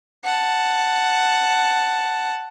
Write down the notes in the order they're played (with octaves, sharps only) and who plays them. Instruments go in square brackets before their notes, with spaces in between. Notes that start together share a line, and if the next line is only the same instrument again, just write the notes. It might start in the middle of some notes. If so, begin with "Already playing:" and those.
[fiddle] F#5 A5